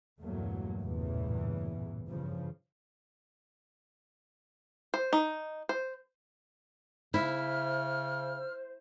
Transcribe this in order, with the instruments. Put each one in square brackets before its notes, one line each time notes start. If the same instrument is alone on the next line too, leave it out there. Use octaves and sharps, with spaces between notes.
[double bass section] E2 G2 A#2 F#3 A3 A#3
A1 E2 G2 A#2 C#3 E3
G2 C#3 F3
[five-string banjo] C5
D#4
C5
[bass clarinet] C#3 [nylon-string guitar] E4 [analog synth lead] C5 [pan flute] F6